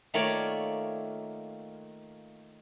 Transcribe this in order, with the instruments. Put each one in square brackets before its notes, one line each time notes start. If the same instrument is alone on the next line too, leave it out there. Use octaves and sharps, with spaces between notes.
[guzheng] D#3 A3 A#3 F4 C#5 D5